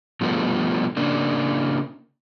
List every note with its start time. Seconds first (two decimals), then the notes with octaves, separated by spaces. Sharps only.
0.21 B2 F3 G3 A3 B3
0.97 C#3 A#3 D4